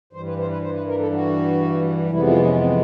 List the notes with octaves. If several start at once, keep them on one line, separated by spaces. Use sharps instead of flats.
G2 E3 G3 C5
B4
C5
B4
C5
B4
A#4
A4
F#4
F2 C3 E3 G#3 B3 E4
F4
C#4
C4